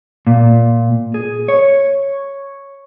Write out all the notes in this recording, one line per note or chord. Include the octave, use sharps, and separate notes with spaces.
A#2
G#4
C#5